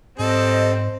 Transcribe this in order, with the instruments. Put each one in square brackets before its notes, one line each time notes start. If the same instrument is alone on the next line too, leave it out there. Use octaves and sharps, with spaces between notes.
[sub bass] G#2 [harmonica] G3 A4 [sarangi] C4 [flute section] D#5